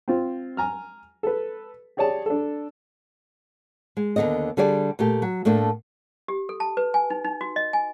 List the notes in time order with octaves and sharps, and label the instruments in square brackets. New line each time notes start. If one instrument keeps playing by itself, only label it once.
[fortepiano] C4 F4 C5
G#5 A#5 F6
A4 B4
G4 G#4 C#5 D5 A5
D4 A4
[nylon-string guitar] G#3
D#2 B2 D3 B3 D#5
D3 G3 G4 G#4 D5
A#2 A3 G4
F#3
A2 A3 A#3 D4
[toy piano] G4
A4
A5
B4
G#5
D#4
D#4
F#4
D#5
G#5